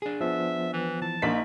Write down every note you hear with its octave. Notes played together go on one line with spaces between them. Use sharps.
D4 G#4
F3 B3 E5
E3
E3 A5
A#1 A#3 D#4 B6